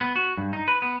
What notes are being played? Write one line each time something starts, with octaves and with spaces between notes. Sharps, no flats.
B3
F#4
G2
D#4
B4
B3